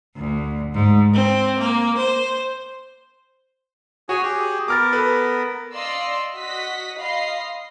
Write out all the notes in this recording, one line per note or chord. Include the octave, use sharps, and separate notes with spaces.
D2
G#2
C4
A#3
C5
F#4 G#4 C#5 G#5
G4 G#4
B3 A#4 D6 F6 A6
A4 B4
D5 D#5 F5 C6 E6
F#4 D#5 B6
D#5 F5 B5 C6 C7